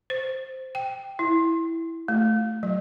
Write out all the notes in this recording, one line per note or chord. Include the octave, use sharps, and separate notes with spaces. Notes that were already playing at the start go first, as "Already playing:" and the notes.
C5
G5
E4
A3
F#3